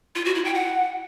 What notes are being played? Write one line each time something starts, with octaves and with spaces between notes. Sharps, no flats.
F4
F#4
E4
G5
F#5